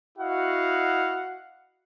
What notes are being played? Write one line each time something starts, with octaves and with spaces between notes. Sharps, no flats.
E4 F#4 D#5 F5 F#5